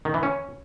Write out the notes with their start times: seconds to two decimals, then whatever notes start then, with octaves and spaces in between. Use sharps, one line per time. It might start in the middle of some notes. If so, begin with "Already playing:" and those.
0.05 D#3
0.14 E3
0.23 C#4